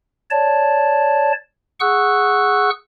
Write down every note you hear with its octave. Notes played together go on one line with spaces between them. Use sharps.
C#5 D5 A5
G#4 F#5 C#6 E6 F#6